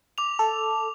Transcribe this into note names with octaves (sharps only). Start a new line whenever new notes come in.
D6 F7
A4